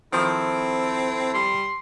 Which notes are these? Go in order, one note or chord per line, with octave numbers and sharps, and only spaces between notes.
D#3 F3 C4 E4 A4
G3 C6